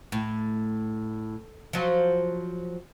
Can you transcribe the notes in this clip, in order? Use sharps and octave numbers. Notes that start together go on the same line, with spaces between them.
A2
F3 F#3